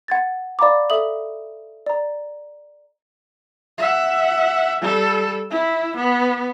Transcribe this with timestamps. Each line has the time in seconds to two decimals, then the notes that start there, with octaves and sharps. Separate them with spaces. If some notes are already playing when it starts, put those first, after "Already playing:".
0.08 F#5 G#6 A6
0.59 D5 F5 A#5 B5 D6
0.90 A4 E5 D#6 F#7
1.86 D5 A#5
3.78 E5 F#5
4.81 G3 A4
5.50 E4
5.97 B3